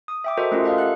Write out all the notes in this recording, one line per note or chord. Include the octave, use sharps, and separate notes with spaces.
D#6
E5 G5 D6
F#4 A4 A#4 C5 D#5
A3 C#4 F4 G4 A#4
A4 D#5 F5
G4 F#5 F#6